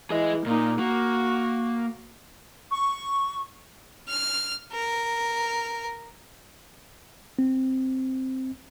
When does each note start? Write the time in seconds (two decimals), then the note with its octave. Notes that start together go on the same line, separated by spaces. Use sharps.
0.10 E3 G#4 D#5
0.46 A#2 A#3 D#4
0.79 A#3 F#4
2.70 C#6
4.09 F6
4.72 A#4
7.39 C4